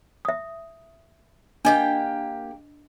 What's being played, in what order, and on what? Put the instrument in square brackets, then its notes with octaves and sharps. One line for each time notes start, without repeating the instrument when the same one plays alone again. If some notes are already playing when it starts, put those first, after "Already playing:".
[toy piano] E5 D#6
[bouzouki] A#3 G4 G5 [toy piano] D4 D#5